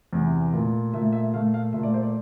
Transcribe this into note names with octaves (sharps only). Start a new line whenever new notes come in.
E2 C3 E3
A#2 A3
A#2 A3 E5
E5
A#2 A3 F5
F5
A#2 A3 E5
D5
C5
D5